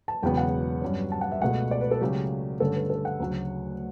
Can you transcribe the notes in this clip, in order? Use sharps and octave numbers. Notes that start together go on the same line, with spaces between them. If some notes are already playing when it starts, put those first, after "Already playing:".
A5
E1 E2 C#3 F#3 B3 G5
F#5
G2 F#3 C#4
A5
F#5
E5
C#2 B2 A3 F#5
D5
B4
A4
C#2 C#3 F#3 A3 G4
G2 D3 A3 C#4 A4
B4
A4
F#5
D2 C#3 F#3